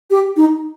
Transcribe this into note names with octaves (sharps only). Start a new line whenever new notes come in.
G4
D#4